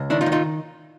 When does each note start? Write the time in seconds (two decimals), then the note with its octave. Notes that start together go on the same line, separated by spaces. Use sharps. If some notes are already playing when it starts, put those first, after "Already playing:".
Already playing: C#2
0.10 D#3 D4 E4
0.21 D#4 F4
0.26 D#3
0.32 D#4 F4